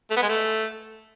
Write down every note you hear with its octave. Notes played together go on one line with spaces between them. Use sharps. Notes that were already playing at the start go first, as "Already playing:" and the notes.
A3
B3
G#3
A3